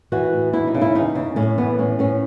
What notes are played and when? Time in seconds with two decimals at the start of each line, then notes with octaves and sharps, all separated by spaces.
0.12 E3 F#4
0.33 A2
0.53 E2 E4
0.67 D#4
0.74 C#3
0.82 E4
0.95 E2 D#4
1.15 C#3
1.36 A2 C#4
1.58 E3 B3
1.78 A2 C#4
1.99 A2 C#4